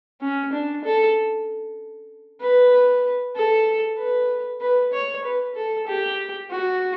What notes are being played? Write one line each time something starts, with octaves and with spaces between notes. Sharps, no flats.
C#4
D4
A4
B4
A4
B4
B4
C#5
B4
A4
G4
F#4